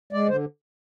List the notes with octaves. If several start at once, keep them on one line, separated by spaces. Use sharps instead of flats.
G#3 D5
D3 C5